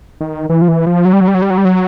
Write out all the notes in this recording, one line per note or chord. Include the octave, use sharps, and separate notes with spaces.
D#3
E3
F3
E3
F3
F#3
G3
F#3
G3
F#3
G3
F#3
G3
F#3